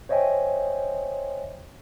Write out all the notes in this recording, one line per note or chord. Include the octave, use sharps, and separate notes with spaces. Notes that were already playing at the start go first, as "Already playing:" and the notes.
C5 C#5 D#5 E5 G5 G#5